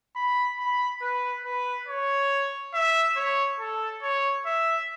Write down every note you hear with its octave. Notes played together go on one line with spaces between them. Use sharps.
B5
B5
B4
B4
C#5
E5
C#5
A4
C#5
E5